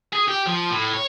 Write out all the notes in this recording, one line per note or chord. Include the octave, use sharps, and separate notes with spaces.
G#4
G4
F3
A2
C#5